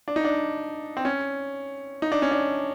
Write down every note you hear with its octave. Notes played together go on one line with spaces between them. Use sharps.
D4
D#4
D4
C4
C#4
D#4
D4
C#4
D4